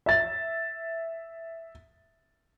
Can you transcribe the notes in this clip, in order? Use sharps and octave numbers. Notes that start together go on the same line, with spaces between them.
E5 A6